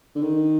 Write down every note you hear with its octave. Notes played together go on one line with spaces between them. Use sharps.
D3
D#3